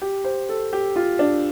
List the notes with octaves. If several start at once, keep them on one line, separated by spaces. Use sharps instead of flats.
G4
C5
A4
G4
F4
D4